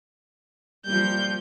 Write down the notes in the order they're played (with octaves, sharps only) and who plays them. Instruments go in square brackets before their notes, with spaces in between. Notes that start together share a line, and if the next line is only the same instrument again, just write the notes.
[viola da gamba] F3 A#3 [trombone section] G3 [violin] G6